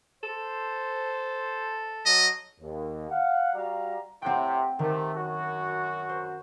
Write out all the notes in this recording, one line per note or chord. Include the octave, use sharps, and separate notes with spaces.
A4 C5
F#3 D#5
D#2
F5 F#5
G3 F#4 D5 F5 A#5
A2 C3 C4 F#5 G5
C3 D#3 A3
F#2 F#4
C5